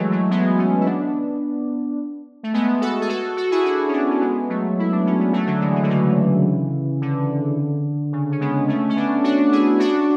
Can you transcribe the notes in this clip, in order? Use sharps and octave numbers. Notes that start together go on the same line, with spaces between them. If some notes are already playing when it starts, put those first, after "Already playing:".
Already playing: E3 F#3 G#3 A3
F#3 A3
G#3 B3
A3 C#4
E4
B3 D4
A3
G#3 B3
F#4 A4
G#4
F#4 A4
F#4 A4
E4 G#4
D4 F#4
C#4
B3 D4
C#4
G#3 B3
F#3 A3
E4
D4
C#4
B3
F#3 A3
D3 F#3
E3 G#3
E3
D3
C#3 E3
D3
C#3
C#4
G#3 B3
A3 C#4
C#4
B3 D4
D4 F#4
E4 G#4
D4 F#4